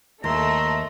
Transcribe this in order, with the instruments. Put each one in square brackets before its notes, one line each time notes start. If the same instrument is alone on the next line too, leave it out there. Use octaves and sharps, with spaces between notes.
[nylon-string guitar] D#2 [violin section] A3 [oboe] A#5 [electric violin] C6 E6